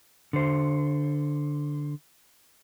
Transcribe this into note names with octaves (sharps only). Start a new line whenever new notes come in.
D3 C5